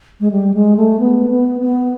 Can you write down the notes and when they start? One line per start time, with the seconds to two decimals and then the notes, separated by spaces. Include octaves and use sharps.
0.20 G#3
0.31 G3
0.54 G#3
0.77 A3
0.99 B3
1.31 B3
1.61 B3